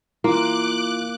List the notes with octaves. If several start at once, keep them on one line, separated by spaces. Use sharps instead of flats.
E3 A#3 F4 D6 F#6